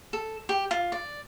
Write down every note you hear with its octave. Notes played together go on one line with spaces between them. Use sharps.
A4
G4
F4
D5